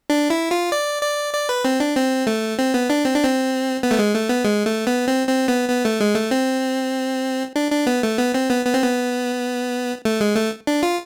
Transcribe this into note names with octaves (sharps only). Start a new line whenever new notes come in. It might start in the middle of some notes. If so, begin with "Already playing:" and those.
D4
E4
F4
D5
D5
D5
B4
C4
D4
C4
A3
C4
B3
D4
C4
D4
C4
B3
A3
G#3
A3
B3
G#3
A3
B3
C4
C4
B3
B3
A3
G#3
A3
C4
D4
D4
B3
A3
B3
C4
B3
B3
C4
B3
A3
G#3
A3
D4
F4